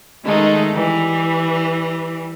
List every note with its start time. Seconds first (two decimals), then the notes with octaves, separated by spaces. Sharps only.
0.24 D#3 G#3 A3 D#4
0.73 E3 G3